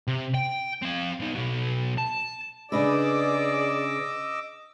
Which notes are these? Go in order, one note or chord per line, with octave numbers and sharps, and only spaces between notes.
C3
G5
C4 F5
B2 D#4
B2 F#3
A5
C#3 D4 G#4 B4 D5 D#5 D6 E6